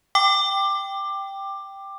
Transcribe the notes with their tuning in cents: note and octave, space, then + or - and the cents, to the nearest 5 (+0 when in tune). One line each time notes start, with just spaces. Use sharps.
G5 +0 D6 +15